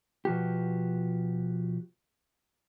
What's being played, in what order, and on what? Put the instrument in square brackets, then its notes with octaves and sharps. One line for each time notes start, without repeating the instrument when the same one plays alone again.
[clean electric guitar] B2 F3 F#4 G4